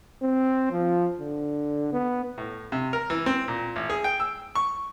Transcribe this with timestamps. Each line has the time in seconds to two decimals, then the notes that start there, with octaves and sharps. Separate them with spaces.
0.22 C4
0.72 F3
1.20 D3
1.92 B3
2.38 A2
2.72 C3
2.93 A#4
3.10 E3
3.26 C4
3.48 A#2
3.76 A1
3.90 G#4
4.04 G5
4.20 E6
4.55 C#6